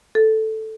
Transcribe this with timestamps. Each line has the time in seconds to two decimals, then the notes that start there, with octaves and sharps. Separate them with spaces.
0.15 A4